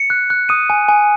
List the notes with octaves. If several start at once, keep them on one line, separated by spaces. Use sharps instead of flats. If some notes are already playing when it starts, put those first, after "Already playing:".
Already playing: C#7
F#6
F#6
D#6 D#7
G#5
G#5